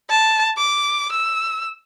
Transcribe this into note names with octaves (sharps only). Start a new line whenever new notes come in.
A5
D6
E6